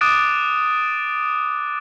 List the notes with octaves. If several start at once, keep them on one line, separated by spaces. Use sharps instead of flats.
D6 D#6 F#6 A6 D7